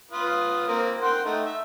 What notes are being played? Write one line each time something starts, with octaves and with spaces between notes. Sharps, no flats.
F4 B4 D#6
A#3 C4 A#4
F#5 G5 C6
A3 D#4
E5